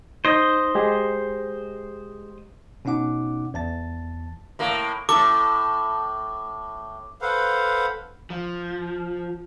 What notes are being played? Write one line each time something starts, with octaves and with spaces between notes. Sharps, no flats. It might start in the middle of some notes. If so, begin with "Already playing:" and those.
D#4 C5 D#5
G#3 G4 G#4
B2 C#4 D#4 F#5 D6
E2 A5 A6
A2 A#3
A2 A4 D6
A4 B4 C5 F5 F#5
F3